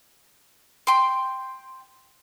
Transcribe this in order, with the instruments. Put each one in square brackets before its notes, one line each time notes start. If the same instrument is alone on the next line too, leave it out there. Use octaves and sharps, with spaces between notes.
[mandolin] G5 C6